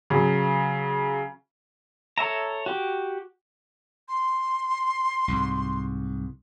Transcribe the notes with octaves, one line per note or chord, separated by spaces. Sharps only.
C#3 F#3
A4 C#5 E5 A#5
F#4 G4
C6
C2 G#2